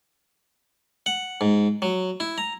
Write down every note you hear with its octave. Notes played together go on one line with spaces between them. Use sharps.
F#5
G#2
F#3
E4
A#5